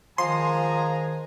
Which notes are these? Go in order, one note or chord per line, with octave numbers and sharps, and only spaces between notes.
D#3 F3 G#3 G#5 A#5 C6